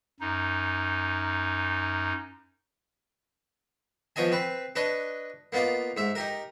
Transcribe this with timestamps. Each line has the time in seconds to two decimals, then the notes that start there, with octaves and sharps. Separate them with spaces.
0.20 F#2 D#4
4.16 F3 B3 C#4 D#5 G#5
4.32 C4 B4
4.76 D4 B4 C#5 D#5
5.52 A#3 B3 D#4 F4 D5
5.97 G#2 E5
6.15 D#4 G4 A#4